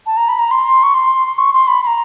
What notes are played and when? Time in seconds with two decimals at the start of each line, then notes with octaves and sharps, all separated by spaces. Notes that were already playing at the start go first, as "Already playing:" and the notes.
0.06 A5
0.17 A#5
0.29 B5
0.39 A#5
0.51 C6
0.83 C#6
0.94 C6
1.38 C#6
1.53 C6
1.68 B5
1.83 B5
1.87 A#5